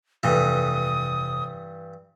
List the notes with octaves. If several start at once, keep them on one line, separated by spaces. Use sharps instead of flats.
F1 G2 E3 A4 D#6